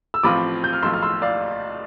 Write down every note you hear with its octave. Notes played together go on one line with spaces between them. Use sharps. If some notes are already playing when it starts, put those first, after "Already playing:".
E6
A1 A2 F3 C4 F4 B5 D6
G6
F6
B1 A2 F3 C6 E6
F6
C6 E6
D5 F5